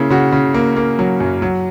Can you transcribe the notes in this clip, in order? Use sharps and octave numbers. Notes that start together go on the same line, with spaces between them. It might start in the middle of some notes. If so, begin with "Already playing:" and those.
Already playing: C#3 A#3 E4
C#3 F#4
C#3
A#3
A#3
F#3
F#2
F#3